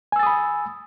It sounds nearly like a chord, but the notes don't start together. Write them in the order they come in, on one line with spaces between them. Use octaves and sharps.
G#5 E6 A6 D#6 B5